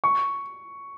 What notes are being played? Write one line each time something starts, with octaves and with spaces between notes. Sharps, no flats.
C#6